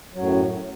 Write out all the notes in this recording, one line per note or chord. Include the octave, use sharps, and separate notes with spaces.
F#2 A2 F#3